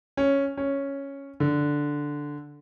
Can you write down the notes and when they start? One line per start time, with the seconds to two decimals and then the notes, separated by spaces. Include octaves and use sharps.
0.17 C#4
0.57 C#4
1.40 D3